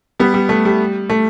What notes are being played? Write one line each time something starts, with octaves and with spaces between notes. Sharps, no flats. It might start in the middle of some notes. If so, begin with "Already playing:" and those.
G3 B3
G3
A3
G3
A3